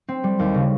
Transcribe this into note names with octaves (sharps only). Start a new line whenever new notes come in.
C4
G3
D#2
C#3